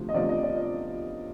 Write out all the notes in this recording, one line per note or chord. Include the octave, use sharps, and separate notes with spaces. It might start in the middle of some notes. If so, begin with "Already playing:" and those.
Already playing: D2 C3 F3
D#5
D2 C3 F3 D5
D#5
D5